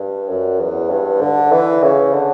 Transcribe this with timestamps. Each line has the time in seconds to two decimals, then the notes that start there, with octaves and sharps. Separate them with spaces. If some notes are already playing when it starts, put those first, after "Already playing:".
Already playing: G2
0.29 F#2
0.59 E2
0.90 G2
1.21 D3
1.52 E3
1.83 C#3
2.13 D3